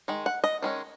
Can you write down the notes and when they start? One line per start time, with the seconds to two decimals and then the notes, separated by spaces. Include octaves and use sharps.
0.08 D#3 G#3
0.26 F#5
0.44 D#5
0.62 D#3 G#3 C#4